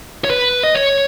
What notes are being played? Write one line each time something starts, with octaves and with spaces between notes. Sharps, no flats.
C#5
B4
D#5
C#5